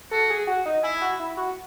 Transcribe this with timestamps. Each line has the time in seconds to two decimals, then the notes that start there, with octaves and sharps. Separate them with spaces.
0.11 F#4 A4
0.30 G#4
0.47 F#4
0.66 D#4
0.83 E4 G#4
1.01 F#4
1.20 E4
1.37 F#4